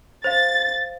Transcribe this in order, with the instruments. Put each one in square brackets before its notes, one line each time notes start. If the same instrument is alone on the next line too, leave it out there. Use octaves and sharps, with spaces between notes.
[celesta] C5 F5 [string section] A6